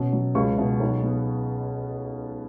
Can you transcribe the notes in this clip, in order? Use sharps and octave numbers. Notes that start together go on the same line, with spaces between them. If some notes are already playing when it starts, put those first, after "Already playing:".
Already playing: B2 C#4
F#3
C#2 C#6
B2
B1
B3